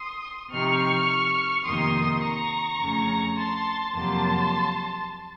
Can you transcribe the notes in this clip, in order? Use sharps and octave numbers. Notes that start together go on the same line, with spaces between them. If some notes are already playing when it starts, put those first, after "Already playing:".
Already playing: C6 D#6
C3 F3 C4 D#4 C#6 F6
F2 C3 D#3 A#3 D#4 C6 D#6
A#5 C#6
F2 C#3 A3 C#4
A5 C6
F2 C3 F#3 A#3 A5 C6